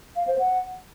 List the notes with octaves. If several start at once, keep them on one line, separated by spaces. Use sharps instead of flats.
F5
C5
F#5